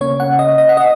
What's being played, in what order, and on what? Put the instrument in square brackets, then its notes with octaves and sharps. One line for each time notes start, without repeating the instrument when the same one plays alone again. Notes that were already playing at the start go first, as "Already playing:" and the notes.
[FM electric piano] C#3 A#3 C#4 C#5
F#5
D#5
D#5
F#5
D#5